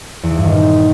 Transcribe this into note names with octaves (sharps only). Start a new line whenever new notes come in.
E2
E3
G2
D#3
A#2